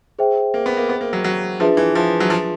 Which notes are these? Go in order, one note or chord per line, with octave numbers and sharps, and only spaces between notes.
G#4 C5 E5 G5
A#3
B3
A#3
B3
A#3
F#3
F#3
F3 D4 F4 G#4 B4 E5
E3
F3
F#3
F3